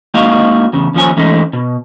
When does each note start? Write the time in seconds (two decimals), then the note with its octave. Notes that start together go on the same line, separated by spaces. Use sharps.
0.14 G#3 A#3 D#4 F#4 D#5 F5
0.73 E2 C#3
0.94 D#2 F3 C#4 G#5
1.17 E3 G#3 A3 C#4 D#4
1.53 B2